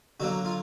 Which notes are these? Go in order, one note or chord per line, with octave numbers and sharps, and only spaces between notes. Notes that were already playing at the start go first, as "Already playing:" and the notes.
D3 F#3 A#3 F#4
F4